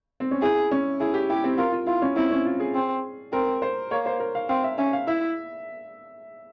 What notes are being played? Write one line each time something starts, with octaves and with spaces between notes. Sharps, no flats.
C4
C#4
E4 G#4
C#4
E4 G#4
G4
E4 G4
C4
F4 A#4
F4
E4 F4
C#4
C4 E4
C#4
F4
G#4
C4
C4 A#4
C5
A#3 C#5
C5
A#4
F5
C4 F5
E5
C#4 E5
F5
E4 E5